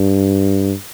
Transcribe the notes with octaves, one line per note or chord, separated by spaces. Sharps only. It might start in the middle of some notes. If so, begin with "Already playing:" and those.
Already playing: G2